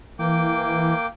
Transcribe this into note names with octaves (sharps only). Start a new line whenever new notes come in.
E3 A#3 G5 D6